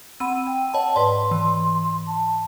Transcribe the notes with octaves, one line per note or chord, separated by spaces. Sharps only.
C4 F#5 B5 E6 D#7
G5
C#5 D#5 F#5 A5 B5
G#2 B4 D5 C6
E3
A5